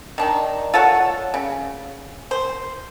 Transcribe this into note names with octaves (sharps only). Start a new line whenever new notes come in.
D#3 D4 D#4
F4 A4 C#5 F#5
C#3
C5